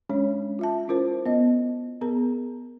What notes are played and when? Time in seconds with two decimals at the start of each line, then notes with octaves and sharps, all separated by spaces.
0.09 G#3 C#4 D4 C#5
0.59 F4 E5 A5
0.88 C#4 E4 F4 A#4 C5
1.26 B3 D#5
2.01 B3 G#4 A#4 A#5